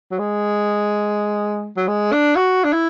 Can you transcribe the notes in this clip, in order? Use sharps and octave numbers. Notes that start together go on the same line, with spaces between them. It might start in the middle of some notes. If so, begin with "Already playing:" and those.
F#3
G#3
F#3
G#3
D4
F#4
D4
E4